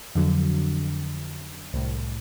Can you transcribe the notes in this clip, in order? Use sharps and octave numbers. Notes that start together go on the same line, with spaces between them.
F2 D3 F#3
C2 A2